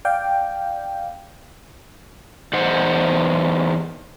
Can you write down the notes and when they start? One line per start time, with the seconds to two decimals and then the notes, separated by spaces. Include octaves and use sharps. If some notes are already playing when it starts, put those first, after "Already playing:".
0.05 D5 F5 G5
2.53 E2 D#4 C5 F#5